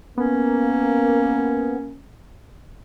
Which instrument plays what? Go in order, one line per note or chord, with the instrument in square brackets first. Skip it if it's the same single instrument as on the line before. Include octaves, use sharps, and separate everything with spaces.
[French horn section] A#3 [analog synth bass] B3 [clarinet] C#4